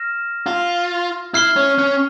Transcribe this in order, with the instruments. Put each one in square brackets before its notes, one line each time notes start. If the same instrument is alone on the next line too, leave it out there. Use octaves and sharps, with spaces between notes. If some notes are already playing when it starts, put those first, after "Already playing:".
Already playing: [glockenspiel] F6 A#6 E7
[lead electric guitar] F4
[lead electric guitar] E4 [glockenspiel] F6 C7 G7
[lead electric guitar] C#4
C#4